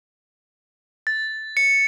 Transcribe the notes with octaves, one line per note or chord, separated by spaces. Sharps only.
A6
C#7